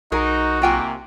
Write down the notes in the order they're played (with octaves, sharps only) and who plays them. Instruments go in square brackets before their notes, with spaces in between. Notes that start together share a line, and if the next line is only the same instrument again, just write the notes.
[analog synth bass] B1 [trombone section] D#4 [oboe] F#4 [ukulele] G#4 A#4
[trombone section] C3 A#3 [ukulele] F4 G5 G#5